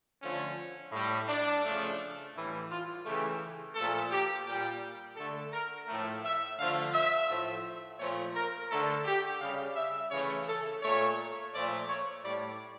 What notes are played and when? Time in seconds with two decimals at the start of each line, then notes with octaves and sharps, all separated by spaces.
0.21 D3 F3 A3 C#4
0.92 A2 G3
1.27 D4
1.63 C#3 F3 A3
2.34 A2 E3 G3 E4
2.68 F4
3.04 C#3 E3 A3 G4
3.75 A#2 F3 A3 A4
4.10 G4
4.45 A#2 G3 G4
5.16 D3 A3 A4
5.51 A#4
5.86 A2 F3 A3
6.22 E5
6.57 D3 F3 A3 F5
6.92 E5
7.28 A2 F3 A3
7.98 A#2 F3 A3 C#5
8.34 A#4
8.69 D3 A3 A4
9.05 G4
9.39 C#3 G3 F5
9.75 E5
10.10 C#3 E3 A3 C#5
10.46 A4
10.81 A#2 A3 C#5
11.52 A#2 F3 A3 D5
11.87 C#5
12.23 A2 G3 D5